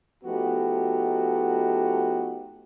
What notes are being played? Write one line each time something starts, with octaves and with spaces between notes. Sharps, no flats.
F3 A3 B3 D#4 F#4 G4